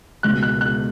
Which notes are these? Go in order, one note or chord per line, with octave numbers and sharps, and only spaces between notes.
C#2 B2 F#6
F#6
F#6